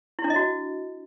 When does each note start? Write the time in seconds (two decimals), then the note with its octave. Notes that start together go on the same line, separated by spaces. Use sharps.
0.19 E4
0.24 D4
0.30 D#5
0.36 F#4